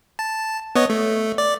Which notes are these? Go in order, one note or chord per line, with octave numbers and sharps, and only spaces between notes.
A5
B3 C#5 D#5
A3
D5